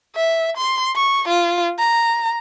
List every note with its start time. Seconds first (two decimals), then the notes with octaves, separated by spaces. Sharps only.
0.16 E5
0.57 C6
0.96 C#6
1.28 F4
1.79 A#5